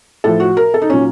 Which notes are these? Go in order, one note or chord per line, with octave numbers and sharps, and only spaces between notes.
A2 F3 A4
F#4
A#4
A4
D#4
A#2 F#3 C#4